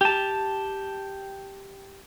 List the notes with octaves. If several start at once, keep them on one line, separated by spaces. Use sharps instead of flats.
G4 A5